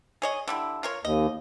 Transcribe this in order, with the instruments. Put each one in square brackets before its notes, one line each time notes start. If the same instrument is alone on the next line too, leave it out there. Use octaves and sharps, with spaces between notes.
[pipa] G#4 C#5 D#5
D3 G3 E4
F4 A#4 C#5
[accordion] D#2 [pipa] D#5